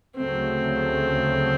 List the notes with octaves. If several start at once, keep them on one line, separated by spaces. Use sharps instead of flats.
D2 C#3 F#3 A3 C4